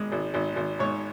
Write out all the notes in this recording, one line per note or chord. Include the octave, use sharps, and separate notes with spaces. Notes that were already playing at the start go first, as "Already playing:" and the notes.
Already playing: G#1 G#3
G#1
G#1
G#1
G#2 C#5